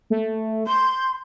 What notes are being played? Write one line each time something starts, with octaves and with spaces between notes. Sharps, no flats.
A3
C6 G6